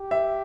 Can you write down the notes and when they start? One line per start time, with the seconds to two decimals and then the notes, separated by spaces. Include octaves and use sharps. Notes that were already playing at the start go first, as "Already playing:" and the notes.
Already playing: G4
0.11 E5